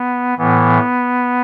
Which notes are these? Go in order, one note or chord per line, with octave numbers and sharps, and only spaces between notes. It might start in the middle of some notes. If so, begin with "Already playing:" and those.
Already playing: B3
A2 E3 B3